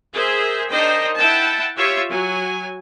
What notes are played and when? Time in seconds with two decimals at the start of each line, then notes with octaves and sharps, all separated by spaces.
0.13 G#4 A#4 C5 E5
0.71 D4 D#4 A#4 C5 D#5 G5
1.17 E4 F#5 G5 A5
1.77 F4 G4 C#5 E5
2.10 F#3 G#5